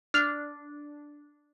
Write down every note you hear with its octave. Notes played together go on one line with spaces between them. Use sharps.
D4 F6 F7